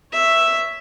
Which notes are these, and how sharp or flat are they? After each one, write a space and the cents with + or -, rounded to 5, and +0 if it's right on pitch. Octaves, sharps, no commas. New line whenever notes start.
C#5 +0 E5 +0